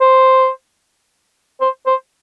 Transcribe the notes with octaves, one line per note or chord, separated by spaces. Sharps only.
C5
C5
C5